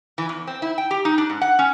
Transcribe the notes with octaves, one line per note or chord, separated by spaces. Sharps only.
E3
E2
C4
E4
G5
G4
D#4
D4
G#2
F#5
C#4